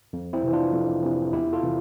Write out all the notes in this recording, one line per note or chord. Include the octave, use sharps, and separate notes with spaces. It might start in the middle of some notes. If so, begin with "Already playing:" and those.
F2
C4 E4
C3 E3
D4 F4
F2
C3 E3
E2 E4 G4
F4 A4
C3 E3